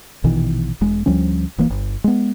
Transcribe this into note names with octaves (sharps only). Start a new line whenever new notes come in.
A#1 B2 D#3 E3
E1 G#3
D2 F3 G3 C#4
D#1 E3 A#3
G1
G#3 B3